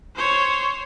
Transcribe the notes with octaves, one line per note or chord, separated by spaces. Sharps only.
C5 C#5